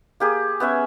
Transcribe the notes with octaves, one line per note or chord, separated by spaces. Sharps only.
A#3 G4 G#4
B3 C#4 E5 G#5